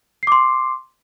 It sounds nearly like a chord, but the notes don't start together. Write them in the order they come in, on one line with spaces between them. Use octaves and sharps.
C7 D6 C6